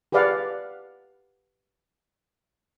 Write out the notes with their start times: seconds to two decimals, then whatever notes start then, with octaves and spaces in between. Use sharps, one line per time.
0.12 G4 G#4 B4 D5 F5 F#5